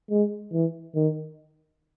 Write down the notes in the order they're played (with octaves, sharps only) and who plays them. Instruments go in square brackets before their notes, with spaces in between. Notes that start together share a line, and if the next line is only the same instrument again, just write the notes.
[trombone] G#3
E3
D#3